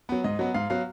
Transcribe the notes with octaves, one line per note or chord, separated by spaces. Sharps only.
F#3 B3
G#2 D#5
F#3 B3
G#2 F5
F#3 B3 F5